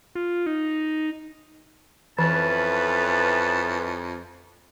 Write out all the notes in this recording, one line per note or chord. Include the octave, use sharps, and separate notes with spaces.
F4
D#4
F2 E3 C#4 E4 B4 A5